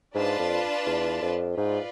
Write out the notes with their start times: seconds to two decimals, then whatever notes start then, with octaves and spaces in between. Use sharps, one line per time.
0.15 G#2 D4 F4 B4 D5 A5
0.39 F2
0.86 E2
1.21 F2
1.57 G#2 F4 B4 D5